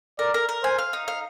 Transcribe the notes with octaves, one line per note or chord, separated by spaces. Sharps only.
A#4 D5
A#4
A#4
C5 G#5
F5
D#4
F5